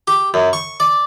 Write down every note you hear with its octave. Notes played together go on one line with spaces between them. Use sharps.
G4
F#2
C#6
D5